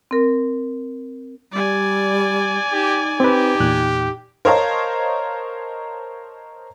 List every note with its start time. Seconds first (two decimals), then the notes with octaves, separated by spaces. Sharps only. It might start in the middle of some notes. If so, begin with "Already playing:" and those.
0.11 C4 A#4
1.53 G3 D5 G#5
2.73 D#4 G4
3.20 C4 G4 B4
3.60 E2 A#2 F#6
4.45 A#4 C5 C#5 D#5 F5 A5